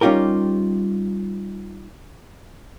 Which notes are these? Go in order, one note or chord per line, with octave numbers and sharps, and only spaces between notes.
G3 C#4 D#4 F4 G4 A#4